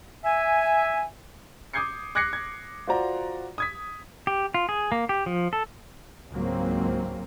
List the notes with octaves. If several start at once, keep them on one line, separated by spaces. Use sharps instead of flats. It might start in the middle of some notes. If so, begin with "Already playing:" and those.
E5 G#5
D6 D#6 G6 G#6 C7 C#7
D6 F#6 G#6 A#6 C7 C#7
G#6
F4 F#4 C5 D5 F#5 A#5
D#6 G#6 B6
G4
F4
G#4
A#3
G4
F3
A4
C#2 G#2 F#3 A#3 C4